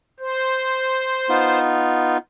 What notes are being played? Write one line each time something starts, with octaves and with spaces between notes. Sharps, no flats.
C5
B3 D#4 F4